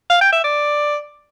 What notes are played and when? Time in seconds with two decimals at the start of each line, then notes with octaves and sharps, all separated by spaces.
0.10 F5
0.21 G5
0.33 E5
0.44 D5